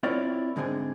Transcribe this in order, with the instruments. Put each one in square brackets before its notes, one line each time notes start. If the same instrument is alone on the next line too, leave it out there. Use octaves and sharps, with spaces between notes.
[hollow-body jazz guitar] C4 E4 F4 A#4 C#5 D5
G#2 D3 G#3 C4 G#4